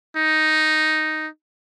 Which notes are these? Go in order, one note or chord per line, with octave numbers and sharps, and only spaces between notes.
D#4